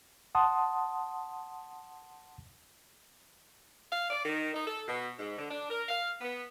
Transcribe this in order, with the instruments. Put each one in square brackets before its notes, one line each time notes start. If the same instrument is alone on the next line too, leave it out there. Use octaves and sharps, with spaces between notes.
[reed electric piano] F#5 A5 C6 D#6
[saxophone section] F5
D5
D#3
D#4
A4
B2
G#2
D3
D4
A#4
F5
B3